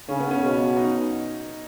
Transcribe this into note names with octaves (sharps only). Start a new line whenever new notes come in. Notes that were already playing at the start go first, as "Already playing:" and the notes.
C#3 C#4
B3
C#4
B2
D#4